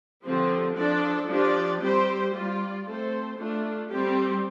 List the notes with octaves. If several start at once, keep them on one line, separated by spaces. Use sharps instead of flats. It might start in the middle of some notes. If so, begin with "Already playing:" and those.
D3 F3 C4 G4
F3 D4 A4 D5
F3 D4 G4 D5
G3 C4 G4 C5
G3 F4 D5
A3 C4 A4 C5
A3 D4 F4
G3 C4 G4